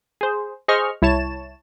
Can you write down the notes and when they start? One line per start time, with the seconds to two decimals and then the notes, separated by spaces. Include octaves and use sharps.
0.21 G#4 C5
0.68 G#4 C5 D#5 C#6 F6
1.02 C2 E4 C#5 A5 E7